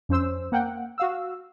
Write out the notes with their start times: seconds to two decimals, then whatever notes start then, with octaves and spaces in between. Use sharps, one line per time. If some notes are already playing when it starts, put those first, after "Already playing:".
0.09 F2 C#4 C5 E6
0.52 A#3 F#5 G5
0.98 F#4 F5 E6